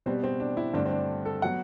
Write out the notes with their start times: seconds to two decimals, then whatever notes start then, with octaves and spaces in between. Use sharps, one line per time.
0.06 B2 G3 B3 C4
0.24 C4
0.40 D4
0.57 E4
0.74 G2 D3 A3 C4 D4
0.86 C4
0.91 D4
1.25 A4
1.42 F#3 B3 F#5